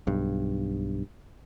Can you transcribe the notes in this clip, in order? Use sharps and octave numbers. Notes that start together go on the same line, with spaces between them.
B1 G2